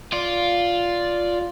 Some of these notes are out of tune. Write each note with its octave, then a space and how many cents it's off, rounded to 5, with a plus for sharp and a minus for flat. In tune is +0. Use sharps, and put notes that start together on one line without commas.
F4 +0 D5 -10